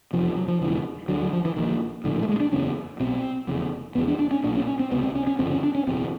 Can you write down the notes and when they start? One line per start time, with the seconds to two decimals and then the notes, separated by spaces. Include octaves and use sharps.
0.13 F1 E2 C3 F3
0.36 F#3
0.48 F3
0.61 D#2 C#3 E3
0.65 E1
1.08 D2 D3 F#3
1.21 F#3
1.33 F3
1.45 E3
1.56 A#1 A#2 D#3
2.04 A#1 A2 D3
2.16 D#3
2.23 A3
2.29 G#3
2.40 D4
2.52 F#1 E2 C#3 C#4
3.00 B1 B2 C4
3.47 F1 E2 C#3
3.95 F1 E2 C#3 B3
4.08 D4
4.19 D4
4.31 C#4
4.44 B1 A#2 D4
4.55 C#4
4.67 C#4
4.79 C4
4.91 C#2 C3 B3
5.03 C4
5.16 C#4
5.27 C#4
5.39 G1 F2 C#3 C4
5.51 C#4
5.63 D4
5.75 C#4
5.87 F#1 E2 B2 C4